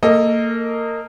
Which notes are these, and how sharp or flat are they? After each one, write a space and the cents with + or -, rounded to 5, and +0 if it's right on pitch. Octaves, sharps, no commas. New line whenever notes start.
A#3 -20 A4 +0 D#5 +0